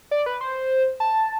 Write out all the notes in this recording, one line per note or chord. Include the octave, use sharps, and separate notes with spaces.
D5
B4
C5
A5